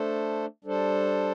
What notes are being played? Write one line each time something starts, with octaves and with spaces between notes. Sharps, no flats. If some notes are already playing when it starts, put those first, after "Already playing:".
Already playing: A3 D4 A4 C5
G3 D4 A4 C5